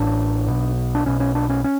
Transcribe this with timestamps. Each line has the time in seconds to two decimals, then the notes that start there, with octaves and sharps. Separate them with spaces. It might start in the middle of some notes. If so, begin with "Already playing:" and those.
Already playing: A1 A2 D4
0.48 B1 B2
0.95 D4
1.06 B1 B2 C#4
1.20 C#4
1.35 D4
1.50 C#4
1.64 C#4